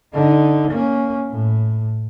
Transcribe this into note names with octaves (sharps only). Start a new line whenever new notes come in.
D3 D#4
A#3 C#4
A2